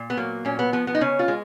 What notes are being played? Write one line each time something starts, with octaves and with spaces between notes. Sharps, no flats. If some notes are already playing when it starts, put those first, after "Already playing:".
Already playing: A#2
B3
F#3 A#3
A#2 C#4
B3
F3 B3
B3
D#4
C#3 C#4
F4
G#3